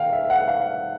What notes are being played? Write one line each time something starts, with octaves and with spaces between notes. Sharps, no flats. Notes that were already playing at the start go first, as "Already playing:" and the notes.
Already playing: F5 G5
E5
F#5
F5